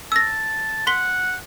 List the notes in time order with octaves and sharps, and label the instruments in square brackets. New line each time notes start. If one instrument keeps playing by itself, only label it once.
[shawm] A5 [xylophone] E6 A#6
[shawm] F#5 [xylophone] C6 B6 G7